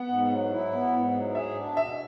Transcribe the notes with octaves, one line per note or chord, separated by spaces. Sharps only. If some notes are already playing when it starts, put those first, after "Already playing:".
Already playing: B3 F#5
G#2
F#3
E4
B3
G#2
F#3
G#4 E5
D4
B2 E5